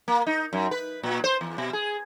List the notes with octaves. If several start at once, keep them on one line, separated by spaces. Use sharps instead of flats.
A#3
D#4
F#2
B4
A#2
C5
E2
B2
G#4